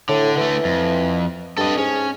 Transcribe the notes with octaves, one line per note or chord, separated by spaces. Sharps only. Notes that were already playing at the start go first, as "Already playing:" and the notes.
A2 D3
D3 E3 A3
F2
G2 A4 D#5
G#2 C#4